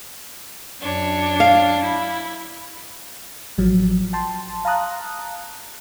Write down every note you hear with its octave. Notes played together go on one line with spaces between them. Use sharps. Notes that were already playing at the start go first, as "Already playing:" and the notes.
F#2 D4 C#5
F5
E4
A1 F3 F#3
G5 A5 C6
F5 A5 A#5 D#6 F#6